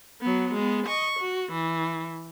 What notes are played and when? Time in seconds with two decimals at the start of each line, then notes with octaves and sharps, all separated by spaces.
0.21 F#3 B3
0.54 G#3 B3
0.86 D#5 C#6
1.20 F#4
1.52 E3